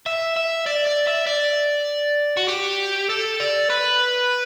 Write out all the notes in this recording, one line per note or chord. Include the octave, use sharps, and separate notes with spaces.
E5
E5
D5
D5
E5
D5
F#4
G4
A4
D5
B4